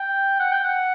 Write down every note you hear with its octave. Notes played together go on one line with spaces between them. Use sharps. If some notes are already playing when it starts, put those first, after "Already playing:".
Already playing: G5
F#5
G5
F#5